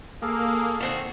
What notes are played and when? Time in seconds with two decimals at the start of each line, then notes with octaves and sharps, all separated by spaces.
0.22 A#3 G#4 A4 F5
0.80 D#3 C4 F#4